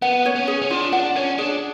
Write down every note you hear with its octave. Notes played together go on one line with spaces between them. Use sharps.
B3 F#5
C#5
C#4
G#4
C#4
D4 F4
D4 F#5
C#4 C#5
D4 G#4